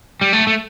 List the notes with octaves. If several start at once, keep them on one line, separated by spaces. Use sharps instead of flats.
G3
A3
A3